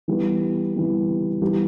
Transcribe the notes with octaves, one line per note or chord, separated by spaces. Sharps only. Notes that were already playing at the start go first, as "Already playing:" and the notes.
E3 G3 B3
E3 G3 B3
E3 G3 B3 G4